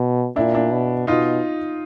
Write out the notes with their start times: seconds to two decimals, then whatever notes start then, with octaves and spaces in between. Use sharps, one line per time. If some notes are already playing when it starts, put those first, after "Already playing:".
Already playing: B2
0.36 A#2 D4 E4
0.54 D4 E4
0.72 B2
1.07 B2 D#4 F4